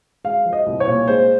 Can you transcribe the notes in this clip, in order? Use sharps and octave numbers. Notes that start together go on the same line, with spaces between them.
G#3 F5
F3
D#5
C2
C#5
A#2
G#3 C5